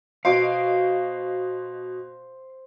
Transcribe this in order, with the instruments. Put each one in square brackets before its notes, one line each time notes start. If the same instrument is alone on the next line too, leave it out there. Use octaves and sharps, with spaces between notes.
[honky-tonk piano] B2 D#5 D7 [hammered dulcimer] C5 [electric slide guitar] F5